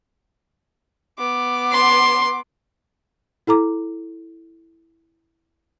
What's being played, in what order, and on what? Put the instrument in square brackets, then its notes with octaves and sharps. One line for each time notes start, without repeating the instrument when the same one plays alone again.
[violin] B3 D6
[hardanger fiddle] C6
[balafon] E4 A4 A#5 D6